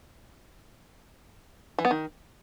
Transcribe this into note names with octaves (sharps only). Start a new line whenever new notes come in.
E3
B3
D#3